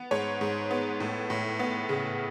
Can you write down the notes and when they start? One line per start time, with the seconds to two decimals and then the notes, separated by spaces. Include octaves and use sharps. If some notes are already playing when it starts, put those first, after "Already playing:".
Already playing: B3
0.11 G#2 C#5
0.41 G#2
0.71 B3
1.00 A2
1.30 A2
1.59 B3
1.89 C#3